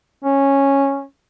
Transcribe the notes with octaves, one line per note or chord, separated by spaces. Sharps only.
C#4